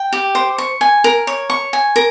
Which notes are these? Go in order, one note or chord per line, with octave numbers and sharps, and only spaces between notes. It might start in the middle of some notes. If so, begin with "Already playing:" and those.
Already playing: G5
G4
C5
C#6
G#5
A#4
C#5
C#6
G#5
A#4